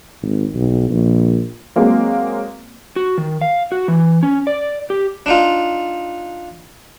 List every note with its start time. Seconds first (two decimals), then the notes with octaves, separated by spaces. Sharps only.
0.22 G#1
0.55 B1
0.90 A#1
1.76 F#3 G#3 A#3 C4
2.96 F#4
3.18 D#3
3.41 F5
3.72 F#4
3.88 E3
4.23 C#4
4.47 D5
4.90 G4
5.26 D4 D#4 F4